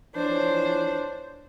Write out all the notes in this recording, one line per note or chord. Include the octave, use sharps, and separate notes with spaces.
E3 F3 D4 C5 C#5